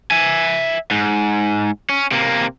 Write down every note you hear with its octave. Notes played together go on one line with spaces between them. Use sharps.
E5 G#5
G#2
C#4
C3 A#3